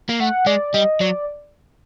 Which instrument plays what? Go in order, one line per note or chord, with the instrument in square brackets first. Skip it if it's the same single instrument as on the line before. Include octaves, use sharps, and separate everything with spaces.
[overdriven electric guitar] A#3
[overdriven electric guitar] A3 [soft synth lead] F#5
[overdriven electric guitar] G#3 [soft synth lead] D5
[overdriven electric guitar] G3 [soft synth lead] D#5
[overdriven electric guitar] F#3 [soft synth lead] D5